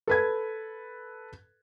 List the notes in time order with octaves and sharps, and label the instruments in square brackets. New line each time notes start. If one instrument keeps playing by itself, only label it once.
[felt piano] A4 B4 G#6